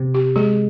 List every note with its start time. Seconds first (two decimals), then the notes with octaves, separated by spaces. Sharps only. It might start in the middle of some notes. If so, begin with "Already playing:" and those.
Already playing: C3
0.14 G4
0.36 G#3 G#4